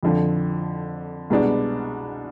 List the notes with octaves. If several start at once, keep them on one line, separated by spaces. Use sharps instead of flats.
F2 D3 F3
C2 B2 G#3 B3 D4